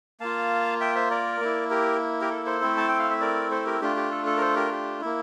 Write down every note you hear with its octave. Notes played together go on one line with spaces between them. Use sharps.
A#3 F4 F5 A5
E5 G5
C5 E5
A#4 D5
A#3 E4
G4 A#4
G4 A#4
A4
A4 C5
A3 C4 E4
A5
G5
F5
E5
A#4 D5
A4 C5
G4 A#4
A3 D4 F4 G4
G4
A4
A4
A#4
A4 C5
G4 A#4
G4
A#3 E4